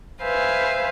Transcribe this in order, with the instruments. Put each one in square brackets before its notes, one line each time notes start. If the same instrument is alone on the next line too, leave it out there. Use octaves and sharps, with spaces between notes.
[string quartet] B4 C5 E5 F5 G#5